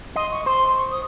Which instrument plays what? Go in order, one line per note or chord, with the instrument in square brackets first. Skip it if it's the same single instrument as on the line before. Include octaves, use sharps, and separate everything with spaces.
[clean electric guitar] D#5 [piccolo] C6
[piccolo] C#6
[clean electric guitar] C5 [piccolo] C6
[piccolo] C#6
D#6